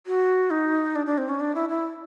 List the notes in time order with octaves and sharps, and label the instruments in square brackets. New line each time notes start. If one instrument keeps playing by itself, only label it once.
[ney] F#4
D#4
D4
D4
C4
C#4
D4
E4
E4